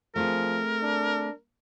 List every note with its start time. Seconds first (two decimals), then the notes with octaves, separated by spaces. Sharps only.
0.16 F3 A3 C4 G#4 A#4
0.82 D4